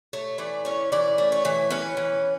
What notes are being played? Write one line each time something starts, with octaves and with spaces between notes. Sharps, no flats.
A3 C#5
E3 D5
C#4 C#5
E3 D5
A3
C#5
E3
C#4 B4
E3